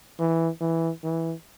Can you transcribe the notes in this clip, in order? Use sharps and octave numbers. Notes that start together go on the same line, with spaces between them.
E3
E3
E3